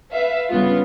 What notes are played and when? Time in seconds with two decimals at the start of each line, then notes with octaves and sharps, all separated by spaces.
0.10 B4 E5 F5
0.50 G2 C#3 B3 F4